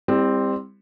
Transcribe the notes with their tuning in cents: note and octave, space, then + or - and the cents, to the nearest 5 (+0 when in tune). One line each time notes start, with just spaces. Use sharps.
G3 +30 C4 +0 E4 -15